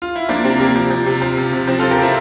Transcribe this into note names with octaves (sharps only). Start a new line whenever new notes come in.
F4
E4
F3 A#3 D4
C3 C4
C3 A#3
F3
F3
C3
F3
C3
C3
F3 C4
F3 F4 A4
G4 A#4
C3 C4 E4